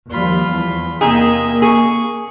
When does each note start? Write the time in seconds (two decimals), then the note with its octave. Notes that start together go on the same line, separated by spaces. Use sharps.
0.11 D#2 F3 G3 F4 B5
0.50 E2
1.01 C3 A#3 D#4 G#4 D#5 E5
1.62 G#4 C#6